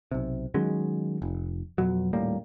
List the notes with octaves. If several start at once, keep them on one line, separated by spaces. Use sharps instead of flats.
B1 C3
D#3 F#3 G#3 C#4
F1
F2 B2 F#3
D#1 A2 G3 A#3